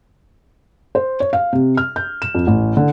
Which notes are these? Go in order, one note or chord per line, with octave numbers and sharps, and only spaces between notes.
C5
C#5
F5
C3
F6
G6
E7
F2
A1
D3